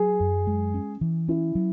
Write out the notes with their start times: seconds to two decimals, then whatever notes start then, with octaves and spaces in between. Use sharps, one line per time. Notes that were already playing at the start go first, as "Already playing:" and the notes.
Already playing: F#3 G#4
0.20 F#2
0.47 G#3
0.74 C#4
1.01 E3
1.28 C#4 E4
1.55 F#3